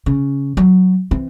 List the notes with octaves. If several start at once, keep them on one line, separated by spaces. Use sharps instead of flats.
C#3
F#3
E3 C4